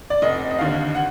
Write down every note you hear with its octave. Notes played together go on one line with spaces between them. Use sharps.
D5
F1 D#5
D#5
D#2 D3 F5
F#5